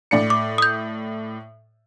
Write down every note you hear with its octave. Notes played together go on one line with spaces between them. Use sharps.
A2 D5 C#7
D6
D#6 G6